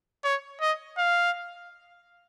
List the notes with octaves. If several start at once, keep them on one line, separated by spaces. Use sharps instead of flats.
C#5
D#5
F5